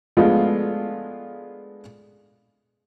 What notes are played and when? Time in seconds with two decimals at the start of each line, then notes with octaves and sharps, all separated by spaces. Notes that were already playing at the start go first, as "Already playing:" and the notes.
0.17 F3 G#3 A3 B3 D4 F4